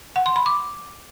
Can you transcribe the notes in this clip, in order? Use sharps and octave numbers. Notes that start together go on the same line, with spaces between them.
F#5
C6
B5
D6